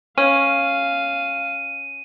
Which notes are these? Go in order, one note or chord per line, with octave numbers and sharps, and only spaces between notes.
C#4 F5 D#7